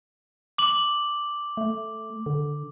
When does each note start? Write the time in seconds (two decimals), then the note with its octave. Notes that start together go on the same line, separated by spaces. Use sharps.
0.58 D6 F#7
1.57 A3
2.26 D3